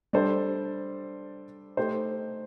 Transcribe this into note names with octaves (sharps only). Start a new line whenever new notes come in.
G3 D4 A4 C5
A3 D#4 G4 C5